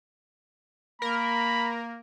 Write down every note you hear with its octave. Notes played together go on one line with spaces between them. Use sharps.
A#3 A#4 B5